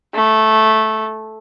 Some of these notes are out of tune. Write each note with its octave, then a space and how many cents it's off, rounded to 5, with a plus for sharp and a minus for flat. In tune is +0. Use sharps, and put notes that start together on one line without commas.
A3 -10